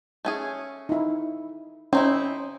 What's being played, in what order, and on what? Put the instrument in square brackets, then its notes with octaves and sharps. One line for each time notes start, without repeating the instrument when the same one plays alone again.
[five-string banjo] A3 C#4 G#4
[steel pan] D#4 E4
[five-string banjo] C4 D#4 E4 [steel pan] C#4